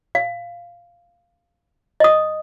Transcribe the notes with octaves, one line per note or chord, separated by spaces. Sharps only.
F5
D#5 D#6